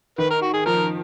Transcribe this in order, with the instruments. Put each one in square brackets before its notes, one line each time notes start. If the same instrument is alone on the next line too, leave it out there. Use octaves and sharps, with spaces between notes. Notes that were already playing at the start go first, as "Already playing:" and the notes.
[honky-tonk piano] D#3 [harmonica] B4
[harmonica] A#4
F#4
G#4
[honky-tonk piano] F3 [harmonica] A#4